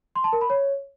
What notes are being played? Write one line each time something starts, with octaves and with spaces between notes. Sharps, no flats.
C6
A5
A#4
B5
C#5